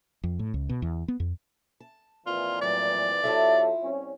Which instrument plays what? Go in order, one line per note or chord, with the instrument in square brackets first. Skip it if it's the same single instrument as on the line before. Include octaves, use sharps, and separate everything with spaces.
[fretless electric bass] F2
A2
C#2
B2
E2
B3
F2
[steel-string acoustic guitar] A5
[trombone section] F2 A#2 E3 [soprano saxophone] F4
[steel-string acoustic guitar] A2 F#3 [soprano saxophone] D5
[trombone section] C3 F#3 A4 [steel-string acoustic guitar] E4 F4 E5
[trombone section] C2 C#4